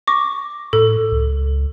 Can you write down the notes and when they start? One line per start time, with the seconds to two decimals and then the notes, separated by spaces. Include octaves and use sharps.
0.07 C#6 D6 A#6
0.73 A2 A4
1.12 C#2